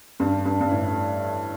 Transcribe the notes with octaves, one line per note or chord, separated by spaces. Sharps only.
G2
G2
G2
A2